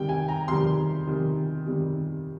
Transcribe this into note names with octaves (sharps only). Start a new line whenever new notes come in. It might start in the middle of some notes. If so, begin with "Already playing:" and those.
Already playing: C3 D#3 G3 G5
G#5
A#5
C3 D#3 G3 C6
C3 D#3 G3
C3 D#3 G3